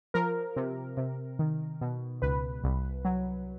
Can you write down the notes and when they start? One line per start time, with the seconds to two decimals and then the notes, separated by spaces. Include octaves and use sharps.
0.14 F3 A#4
0.56 C3
0.97 C3
1.39 D#3
1.81 B2
2.22 C#2 B4
2.64 C2
3.05 F#3